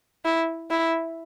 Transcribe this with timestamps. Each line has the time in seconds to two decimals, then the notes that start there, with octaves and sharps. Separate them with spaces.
0.25 E4
0.70 E4